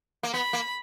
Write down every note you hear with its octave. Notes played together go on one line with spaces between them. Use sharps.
A#3
B3 B5
A#3